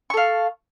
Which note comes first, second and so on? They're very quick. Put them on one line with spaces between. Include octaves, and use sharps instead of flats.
C#6 A4 F5